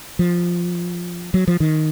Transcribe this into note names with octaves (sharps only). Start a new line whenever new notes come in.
F3
F#3
F3
D#3